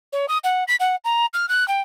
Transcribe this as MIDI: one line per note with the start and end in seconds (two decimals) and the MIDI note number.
0.13 0.26 73
0.28 0.38 87
0.44 0.64 78
0.68 0.76 95
0.80 0.96 78
1.04 1.26 82
1.34 1.48 89
1.49 1.67 90
1.68 1.81 79